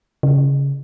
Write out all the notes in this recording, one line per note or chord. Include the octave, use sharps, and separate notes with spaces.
C#3